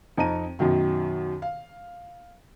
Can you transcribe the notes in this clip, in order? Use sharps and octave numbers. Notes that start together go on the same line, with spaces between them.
F2 D#4 A#5 D#7
F#2 B2 D#3 F#3
F5